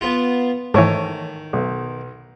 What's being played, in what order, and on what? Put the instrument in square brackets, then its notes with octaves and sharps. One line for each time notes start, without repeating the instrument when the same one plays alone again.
[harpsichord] B3 F4
[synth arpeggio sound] G#2 E3 [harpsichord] D#3 [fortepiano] A3 C#5
[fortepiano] B1